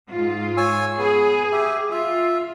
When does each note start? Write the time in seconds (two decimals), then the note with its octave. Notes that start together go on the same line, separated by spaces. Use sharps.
0.12 G#2 F4
0.57 C#5 G#5 E6
0.98 B3 G#4
1.52 G4 E5
1.91 F4 E5